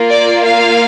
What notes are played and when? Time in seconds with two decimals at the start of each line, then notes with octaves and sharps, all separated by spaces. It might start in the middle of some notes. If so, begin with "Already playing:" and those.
Already playing: A#3 F4
0.09 D5
0.43 F5